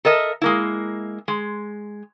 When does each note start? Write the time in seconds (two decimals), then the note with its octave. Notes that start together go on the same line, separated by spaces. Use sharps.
0.05 A4 A#4 D#5 E5
0.41 G#3 A#3 E4
1.28 G#3